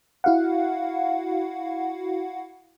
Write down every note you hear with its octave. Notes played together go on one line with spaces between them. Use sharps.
E4 F#4 F5 F#5